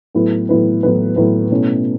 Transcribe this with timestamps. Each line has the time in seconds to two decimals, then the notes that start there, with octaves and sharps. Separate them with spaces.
0.14 A2 F#3 B3 E4 B4
0.49 A2 F#3 B3 E4 B4
0.83 A2 F#3 B3 E4 B4
1.16 A2 F#3 B3 E4 B4
1.51 B2 A3 C#4 E4